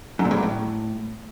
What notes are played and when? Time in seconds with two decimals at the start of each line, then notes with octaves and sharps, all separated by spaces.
0.19 F#2
0.25 A#2
0.31 G2
0.37 E2
0.43 A2